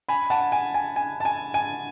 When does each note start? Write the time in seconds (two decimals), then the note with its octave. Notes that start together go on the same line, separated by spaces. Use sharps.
0.09 G#5 B5
0.30 F#5 A5
0.52 G#5
0.74 G#5
0.96 G#5
1.20 A5
1.25 G#5
1.54 G#5